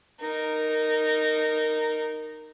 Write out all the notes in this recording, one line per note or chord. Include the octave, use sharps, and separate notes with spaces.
D#4 A#4